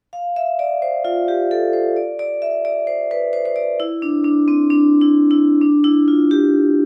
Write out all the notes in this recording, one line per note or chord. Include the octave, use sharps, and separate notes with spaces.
F5
E5
D5
C5
F4
G4
A4
C5
D5
D5
E5
D5
C5
B4
C5
C5
D5
E4
D4
D4
C4
D4
E4
E4
D4
E4
F4
G4